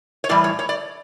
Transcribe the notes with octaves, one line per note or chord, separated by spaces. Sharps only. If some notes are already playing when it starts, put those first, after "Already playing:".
C#5
A2 E3 G3 D5
C#5
C#5
D5